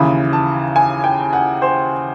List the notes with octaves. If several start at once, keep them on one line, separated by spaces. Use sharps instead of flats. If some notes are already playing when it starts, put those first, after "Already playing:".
Already playing: D#2 C#3 E3 B5
A5
G#5
G5
F#5
C5